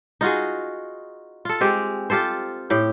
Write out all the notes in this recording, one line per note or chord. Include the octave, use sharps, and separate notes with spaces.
D#4 F4 F#4 G#4
F4 A4
G#3 C4 G4
F4 G4 A4 C5
A2 G4 G5